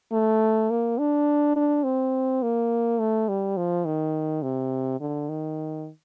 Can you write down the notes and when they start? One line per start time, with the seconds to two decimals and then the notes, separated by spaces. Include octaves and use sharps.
0.12 A3
0.70 A#3
0.99 D4
1.56 D4
1.84 C4
2.43 A#3
3.00 A3
3.29 G3
3.57 F3
3.86 D#3
4.43 C3
5.00 D3
5.29 D#3